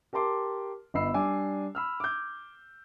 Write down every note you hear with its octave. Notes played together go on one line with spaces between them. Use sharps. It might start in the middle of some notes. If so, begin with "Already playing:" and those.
G4 A#4 A5 C6 D6
G1 B3 D#5 B5 E6 C7
G3 D4 G#5 D6
B5 E6 F6
D6 G6